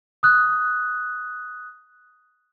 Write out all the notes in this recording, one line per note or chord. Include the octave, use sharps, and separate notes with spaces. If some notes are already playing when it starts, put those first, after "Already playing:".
D#6 F#6